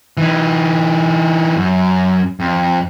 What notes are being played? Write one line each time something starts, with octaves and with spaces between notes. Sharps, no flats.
E3 D#4
F#2
F2